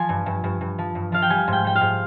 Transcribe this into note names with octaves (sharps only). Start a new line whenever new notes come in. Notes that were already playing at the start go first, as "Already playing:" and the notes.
Already playing: F3 G#5
G2
G2
G2
G2
F3
G2
F3 F5
G5
G3 G#5
G#2 G5
G3 G5
F5
G#2